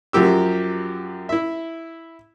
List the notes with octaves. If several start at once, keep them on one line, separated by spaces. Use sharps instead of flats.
F#2 F3 F#3 G4 E6
E4 E5